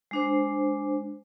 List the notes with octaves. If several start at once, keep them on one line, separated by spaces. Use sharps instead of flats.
G#3 D4 C5